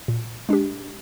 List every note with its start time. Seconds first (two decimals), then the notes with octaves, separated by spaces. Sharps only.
0.08 A#2
0.49 G#3 D4 G4